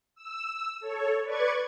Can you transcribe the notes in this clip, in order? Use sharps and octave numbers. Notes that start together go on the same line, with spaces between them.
E6
A4 C#5
B4 D5 C#6 G#6